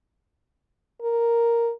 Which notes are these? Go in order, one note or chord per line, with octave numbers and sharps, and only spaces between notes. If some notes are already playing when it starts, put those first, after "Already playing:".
A#4